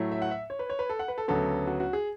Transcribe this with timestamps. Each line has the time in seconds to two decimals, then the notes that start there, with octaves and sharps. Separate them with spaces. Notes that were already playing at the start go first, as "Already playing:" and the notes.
Already playing: A2 F#3 A3
0.12 E5
0.22 F#5
0.31 E5
0.50 C#5
0.59 B4
0.70 C#5
0.79 B4
0.89 A4
0.99 F#5
1.08 B4
1.18 A4
1.28 D2 C#3 F#3 B3 A4
1.67 F#4
1.80 F#4
1.93 G#4